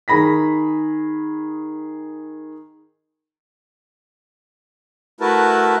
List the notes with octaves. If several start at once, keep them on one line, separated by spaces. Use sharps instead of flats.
D#3 G#4 B5 A#6 B6
A3 E4 F#4 A#4 B4 A5